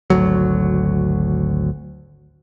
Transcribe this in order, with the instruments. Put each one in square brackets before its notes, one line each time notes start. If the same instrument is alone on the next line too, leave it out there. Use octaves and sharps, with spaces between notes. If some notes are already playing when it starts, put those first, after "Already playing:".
[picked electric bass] G#1 D2 F#3